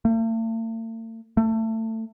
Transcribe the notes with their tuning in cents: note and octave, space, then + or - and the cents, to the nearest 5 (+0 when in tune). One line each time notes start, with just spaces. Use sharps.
A3 +45
A3 +25